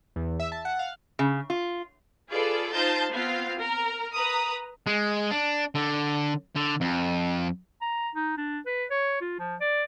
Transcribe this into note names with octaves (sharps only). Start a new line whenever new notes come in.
E2
E5
A5
F#5
F5
C#3
F4
F4 G#4 A4 B4 D5
D#4 F4 C5 A5 G6 A6
B3 C4 F4 F5
A#4 A#5
B4 A#5 D#6
G#3
D4
D3
D3
F2
A#5
D#4
D4
B4
C#5
F4
F3
D5